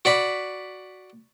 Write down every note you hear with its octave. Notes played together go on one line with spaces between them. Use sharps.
F#4 D5 B5